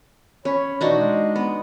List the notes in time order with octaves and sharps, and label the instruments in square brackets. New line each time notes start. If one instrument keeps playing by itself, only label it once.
[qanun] C#4 [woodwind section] C#5 B5
[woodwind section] B2 E3 A3 [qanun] D4 D#4 F#4
[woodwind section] G#3 D#5
[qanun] B3